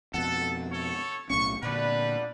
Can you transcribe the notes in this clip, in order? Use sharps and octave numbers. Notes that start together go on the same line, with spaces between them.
F2 B2 A4 F#5
A4 C#5
B1 A2 A#3 C#4 C#6
A#2 D3 G3 B3 D4 B4